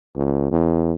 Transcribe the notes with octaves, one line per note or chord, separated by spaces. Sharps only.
C#2
E2